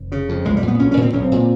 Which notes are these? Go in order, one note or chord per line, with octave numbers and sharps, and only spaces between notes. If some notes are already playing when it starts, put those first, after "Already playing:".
Already playing: F1
C#3
F2
B1 G#3
G3
A#2
B3
B1 C#4
C#4
A#2 C4
B1 C#4
C4
A#2